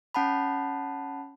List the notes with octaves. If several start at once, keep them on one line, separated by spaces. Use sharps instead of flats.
C#4 F#5 A5 B5